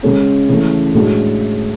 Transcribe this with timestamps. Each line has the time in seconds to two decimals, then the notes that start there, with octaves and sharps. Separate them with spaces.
0.03 C#3 G#3 C#4
0.49 C#3 E3 A3
0.94 A2 G#3 D4 F#4